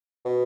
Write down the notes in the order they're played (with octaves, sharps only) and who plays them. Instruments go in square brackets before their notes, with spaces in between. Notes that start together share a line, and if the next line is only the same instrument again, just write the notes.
[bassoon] B2